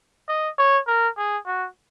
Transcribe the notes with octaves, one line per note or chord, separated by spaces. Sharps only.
D#5
C#5
A#4
G#4
F#4